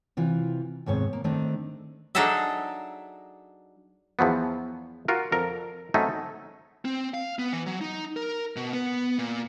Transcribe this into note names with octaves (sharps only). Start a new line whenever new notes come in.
C3 E3 F4
D#2 G#2 C3 B3 C#5
A#3
D#3 A3 C4 D4 D#4
F#3 D4 D#4 G#4 A4 E5
E2 F3 F#3 B3
F4 F#4 A#4
F2 A#4
F#3 A3 C4 C#4 D#4
C4
F5
B3
E3
F#3
D#4
A#4
B2
B3
A#2